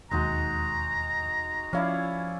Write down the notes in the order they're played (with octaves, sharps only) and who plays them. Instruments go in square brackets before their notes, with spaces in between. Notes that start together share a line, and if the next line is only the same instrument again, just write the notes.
[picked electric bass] E1 D#2 [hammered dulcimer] G#3 D#4 F#4 [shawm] A#5
[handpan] F3 F5 [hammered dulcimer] C#4 E4 D5